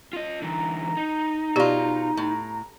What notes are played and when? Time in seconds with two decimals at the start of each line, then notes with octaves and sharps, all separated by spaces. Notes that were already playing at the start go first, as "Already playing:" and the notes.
0.13 F4 D#5
0.42 D3 E3 A#5
0.97 D#4
1.56 B2 F4 G4 D5
2.17 A2